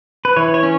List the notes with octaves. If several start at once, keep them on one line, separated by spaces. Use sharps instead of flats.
B4
E3 C#5
C#5
C#4